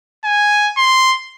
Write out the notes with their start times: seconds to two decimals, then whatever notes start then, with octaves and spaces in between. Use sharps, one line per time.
0.24 G#5
0.77 C6